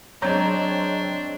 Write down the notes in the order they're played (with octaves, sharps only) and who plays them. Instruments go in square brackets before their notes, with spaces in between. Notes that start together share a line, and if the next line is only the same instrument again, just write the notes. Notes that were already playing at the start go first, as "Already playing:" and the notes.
[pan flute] F#3 [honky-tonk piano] G#3 C4 C#5 [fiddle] D4 [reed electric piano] A#5 G6